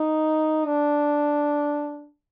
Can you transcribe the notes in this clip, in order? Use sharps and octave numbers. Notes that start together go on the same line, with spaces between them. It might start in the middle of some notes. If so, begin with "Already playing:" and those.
Already playing: D#4
D4